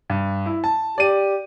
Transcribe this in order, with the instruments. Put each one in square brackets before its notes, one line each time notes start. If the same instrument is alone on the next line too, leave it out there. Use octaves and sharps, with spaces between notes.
[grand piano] G2
E4
A5
[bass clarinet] G4 [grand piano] D5 D#7